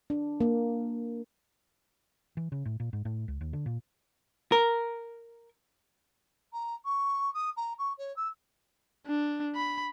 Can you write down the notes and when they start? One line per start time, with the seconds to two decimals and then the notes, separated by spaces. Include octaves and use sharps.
0.10 D4
0.41 A#3
2.37 E3
2.52 C#3
2.65 A2
2.80 A#2
2.93 G#2
3.05 A2
3.28 C#2
3.41 D#2
3.53 D3
3.66 A#2
4.52 A#4
6.53 A#5
6.85 C#6
7.34 D#6
7.57 A#5
7.79 C#6
7.98 C#5
8.16 E6
9.07 D4
9.56 B5